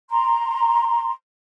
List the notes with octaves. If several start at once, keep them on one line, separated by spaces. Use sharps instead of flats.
A#5 C6